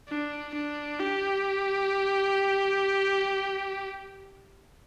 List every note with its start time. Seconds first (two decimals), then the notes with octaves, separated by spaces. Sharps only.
0.09 D4
0.54 D4
0.99 G4